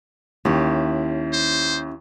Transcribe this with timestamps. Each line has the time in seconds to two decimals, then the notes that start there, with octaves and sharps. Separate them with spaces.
0.45 D#2 C#4 E4 G4
1.33 C5